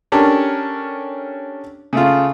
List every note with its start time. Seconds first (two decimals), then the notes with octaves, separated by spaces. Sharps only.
0.12 C#4 D4 G4 A4 A#4 C#5
1.93 C#3 A3 F4